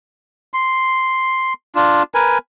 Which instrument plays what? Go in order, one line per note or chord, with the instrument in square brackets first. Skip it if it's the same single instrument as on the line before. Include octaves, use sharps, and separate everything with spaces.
[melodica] C6
D4 F4
A#4 B4 G#5